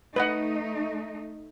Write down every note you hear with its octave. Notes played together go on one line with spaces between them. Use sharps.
A3 D#4 B4 D#5 F#5